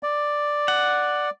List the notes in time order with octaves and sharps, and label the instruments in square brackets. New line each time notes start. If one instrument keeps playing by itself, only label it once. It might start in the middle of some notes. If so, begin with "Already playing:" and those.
[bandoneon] D5
[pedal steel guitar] F#5